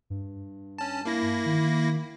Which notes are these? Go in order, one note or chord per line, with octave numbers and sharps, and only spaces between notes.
G2
C#4 A5
A#3 E4 A#6
D#3